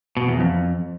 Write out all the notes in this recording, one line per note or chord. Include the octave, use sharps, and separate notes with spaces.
B2
E2
F2